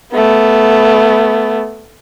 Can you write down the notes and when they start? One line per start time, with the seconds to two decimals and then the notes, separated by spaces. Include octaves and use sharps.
0.13 A3 B3